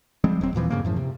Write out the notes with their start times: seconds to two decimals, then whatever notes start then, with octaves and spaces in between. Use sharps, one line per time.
0.24 F3 G3 G#3 C4
0.41 E1 F#3 C4
0.55 D#2 A#2 E3 F3
0.70 G2 C#3 A#3
0.85 F#2 A2 F3
0.96 C3